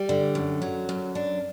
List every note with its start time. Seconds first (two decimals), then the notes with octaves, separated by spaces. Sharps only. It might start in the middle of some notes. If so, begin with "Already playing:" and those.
Already playing: G3
0.09 D3
0.35 F#2
0.62 F#3
0.89 F#2
1.15 D4